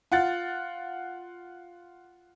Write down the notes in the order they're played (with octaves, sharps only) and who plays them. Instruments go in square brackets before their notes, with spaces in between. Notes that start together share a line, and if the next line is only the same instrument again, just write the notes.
[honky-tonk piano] F4 F#5 A6